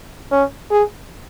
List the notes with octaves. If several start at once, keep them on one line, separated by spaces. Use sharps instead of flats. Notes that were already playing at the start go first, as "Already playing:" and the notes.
C#4
G#4